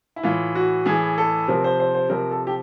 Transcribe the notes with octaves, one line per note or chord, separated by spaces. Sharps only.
E4
A2 E3 F4
F#4
A2 E3 G#4
A4
C3 F3 A#4
C5
C5
C5
C3 F3 A#4
A4
G4